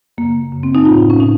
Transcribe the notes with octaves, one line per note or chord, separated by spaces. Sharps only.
F#2 C#3 A#3
F#2 C#3
C4
D#4
A2 F4
C#4
A2 D#4